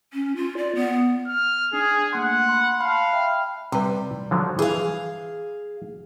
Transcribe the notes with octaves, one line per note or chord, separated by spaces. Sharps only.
C#4
F4
D5
B3
F6
D4 G#4
A3 A#3 F#5 C6
B5 C6
F5 A5 B5
E5 G5 B5
C3 G3 B4
D3 F3 F#3
E3 G#4 F5